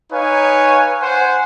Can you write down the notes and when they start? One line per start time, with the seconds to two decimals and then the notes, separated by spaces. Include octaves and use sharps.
0.12 D#4 B4 C#5 F5 G#5
1.02 C5 F#5 G#5